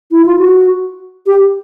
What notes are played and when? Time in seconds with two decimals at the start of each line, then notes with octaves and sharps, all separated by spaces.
0.11 E4
0.25 F4
0.39 F#4
1.26 G4